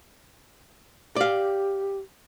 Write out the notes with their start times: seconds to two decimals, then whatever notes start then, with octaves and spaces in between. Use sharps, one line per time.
1.16 G4 D5 F5